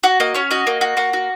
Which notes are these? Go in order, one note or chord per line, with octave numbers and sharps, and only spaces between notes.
F#4 F#5
A#3 D#5
C#4 C#5
F#4 D#5
A#3
F#4
A#3 F#5
F#4